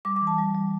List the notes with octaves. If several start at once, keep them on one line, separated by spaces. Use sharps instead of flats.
G3 D6
D6
E3
A5
G3
G3